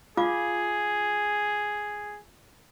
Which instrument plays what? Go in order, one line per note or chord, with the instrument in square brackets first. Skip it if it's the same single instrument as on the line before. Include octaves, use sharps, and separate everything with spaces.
[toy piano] F4 F5 D6 [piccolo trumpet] G#4